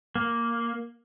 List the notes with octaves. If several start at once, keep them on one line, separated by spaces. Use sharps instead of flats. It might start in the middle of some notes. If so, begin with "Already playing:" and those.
A#3